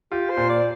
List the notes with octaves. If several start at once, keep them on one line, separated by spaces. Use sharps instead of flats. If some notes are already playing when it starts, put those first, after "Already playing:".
F4 G4
C5
A#2
D5